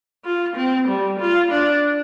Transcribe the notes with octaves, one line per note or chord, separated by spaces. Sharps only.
F4
C4
G3
F4
D4